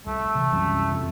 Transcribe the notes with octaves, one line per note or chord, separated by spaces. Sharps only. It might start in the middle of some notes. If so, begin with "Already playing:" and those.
C2 A3
C3 E3
C2 F#2
F2